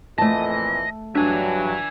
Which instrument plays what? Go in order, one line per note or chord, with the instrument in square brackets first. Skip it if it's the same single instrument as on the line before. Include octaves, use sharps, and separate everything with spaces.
[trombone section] F2 A#2 E3 [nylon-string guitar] A3 A5 [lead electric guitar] D#5
[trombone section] G2 F#3 [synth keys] D4 [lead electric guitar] E5 G#5